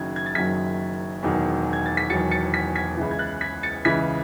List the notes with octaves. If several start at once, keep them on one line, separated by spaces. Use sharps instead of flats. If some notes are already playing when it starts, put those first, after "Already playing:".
Already playing: F#1 F#2 D#3 F#3 G#6
G#6
A6
F#1 F#2 D#3 F#3 G#6 B6
E1 E2 D#3 F#3
G#6
A6
B6
E1 E2 D#3 F#3 A6 C#7
A6 C#7
G#6 B6
G#6 B6
C#2 C#3 E3
G#6
F#6 A6
G#6 B6
A6 C#7
C#2 C#3 E3 G#6 B6